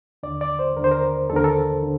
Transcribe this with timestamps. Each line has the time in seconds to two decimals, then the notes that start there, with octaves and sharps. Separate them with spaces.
0.23 D#2 D3 D5
0.41 D5
0.59 C5
0.76 D#2 D3 A#4
0.84 C5
0.91 A#4
1.29 D#2 A4
1.33 D3 A#4
1.44 A4
1.83 D3